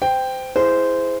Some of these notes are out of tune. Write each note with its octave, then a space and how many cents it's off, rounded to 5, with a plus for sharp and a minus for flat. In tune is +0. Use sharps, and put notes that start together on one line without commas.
C5 -25 G5 +0
E4 +0 G#4 +0 C5 -15